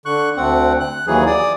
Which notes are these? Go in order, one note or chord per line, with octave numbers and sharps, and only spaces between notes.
D3 C#6 F#6
D2 C4 F#5
F#6
D#2 E3 F#3 G#4
D5 D#6